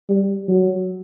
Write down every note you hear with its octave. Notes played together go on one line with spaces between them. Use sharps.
G3
F#3